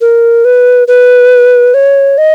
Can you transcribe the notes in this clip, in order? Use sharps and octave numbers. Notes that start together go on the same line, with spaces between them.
A#4
B4
B4
C#5
D#5